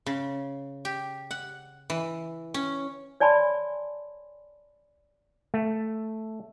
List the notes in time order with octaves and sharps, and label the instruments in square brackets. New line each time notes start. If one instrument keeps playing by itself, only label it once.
[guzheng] C#3
G4
F#5
E3
C#4
[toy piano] C#5 D5 G#5 A5 B5 C6
[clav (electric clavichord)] A3